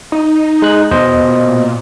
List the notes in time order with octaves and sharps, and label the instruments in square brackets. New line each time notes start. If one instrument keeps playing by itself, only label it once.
[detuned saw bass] D#4
[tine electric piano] G#3 F#6
[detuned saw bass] E2 [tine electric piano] B2 C5 D#5
[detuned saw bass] A#2